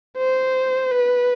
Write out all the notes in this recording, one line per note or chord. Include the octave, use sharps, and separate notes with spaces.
C5
B4